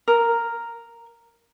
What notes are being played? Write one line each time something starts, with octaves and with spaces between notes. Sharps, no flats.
A#4